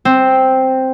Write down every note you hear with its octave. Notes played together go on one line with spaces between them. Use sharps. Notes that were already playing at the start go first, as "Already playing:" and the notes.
C4